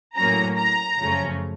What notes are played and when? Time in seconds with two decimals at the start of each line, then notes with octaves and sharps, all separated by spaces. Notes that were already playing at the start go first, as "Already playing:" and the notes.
0.17 A2 F#3 A#3 C#4 A#5
0.57 A#5
0.98 F#2 C#3 F3 A3 C#4